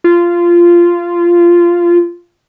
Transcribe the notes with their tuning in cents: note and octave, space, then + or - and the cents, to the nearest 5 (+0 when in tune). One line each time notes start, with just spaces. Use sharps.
F4 -15